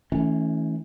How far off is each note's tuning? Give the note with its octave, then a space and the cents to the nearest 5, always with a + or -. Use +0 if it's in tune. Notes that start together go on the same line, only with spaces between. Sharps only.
E3 -35 A3 +0 C#4 +0